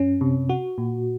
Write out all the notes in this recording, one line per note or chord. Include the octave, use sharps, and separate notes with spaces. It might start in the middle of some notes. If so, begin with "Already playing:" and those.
Already playing: F#2 C#4
C3
F#4
A#2